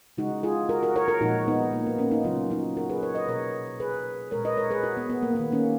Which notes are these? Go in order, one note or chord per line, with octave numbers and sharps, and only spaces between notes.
C#3 G#3 D#4 F#4
F4 G#4
F#4 A#4
F#4 A#4
A#4 C#5
F#4 A#4
A#2 F3 G#3 D#4 F#4
B3 D#4
A#3
B3
A#3 C#4
B3 D#4
C#3 F#3 A#3 C#4 F4
D#4 F#4
F#4 A#4
G#4 B4
A#4 C#5
B4 D#5
B2 A#3 A#4 C#5
G#4 B4
A#2 G#3 A#4 C#5
B4 D#5
A#4 C#5
G#4 B4
F#4 A#4
B3
B3
A#3
D#3 A#3 B3
A#3 C#4